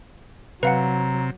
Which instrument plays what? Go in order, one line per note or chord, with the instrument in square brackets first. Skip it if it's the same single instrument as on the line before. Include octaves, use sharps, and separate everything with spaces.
[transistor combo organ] C3 [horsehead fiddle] F#3 [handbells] B4 F5 F#5 [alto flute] A#5